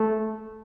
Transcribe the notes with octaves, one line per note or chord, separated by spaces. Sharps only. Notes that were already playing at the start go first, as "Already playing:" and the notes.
Already playing: A3